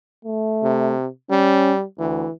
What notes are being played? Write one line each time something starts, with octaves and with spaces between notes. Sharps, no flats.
A3
C3
G3 C#4
D2 E3